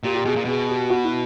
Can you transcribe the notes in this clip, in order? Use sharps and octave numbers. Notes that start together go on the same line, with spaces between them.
A#2 G4
G4
B2 G#4
A#2
B2 G#4
G4
F#4
E4